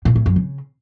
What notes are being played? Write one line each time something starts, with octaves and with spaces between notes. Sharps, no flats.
A#2
A2
F#2
C#3